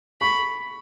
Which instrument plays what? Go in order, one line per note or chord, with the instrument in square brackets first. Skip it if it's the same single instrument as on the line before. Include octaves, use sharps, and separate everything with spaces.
[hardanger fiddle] B5 [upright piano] C#6